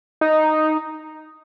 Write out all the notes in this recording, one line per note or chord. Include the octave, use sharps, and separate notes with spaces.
D#4